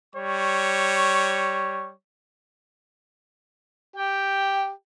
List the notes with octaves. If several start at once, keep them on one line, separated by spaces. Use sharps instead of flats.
G3 C#5 C#6
G4 G5